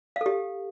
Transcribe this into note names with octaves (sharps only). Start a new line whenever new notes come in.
G4 A4 F5